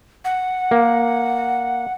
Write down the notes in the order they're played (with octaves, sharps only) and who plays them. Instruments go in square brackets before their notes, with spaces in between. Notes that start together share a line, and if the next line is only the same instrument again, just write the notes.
[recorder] F#5
[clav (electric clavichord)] A#3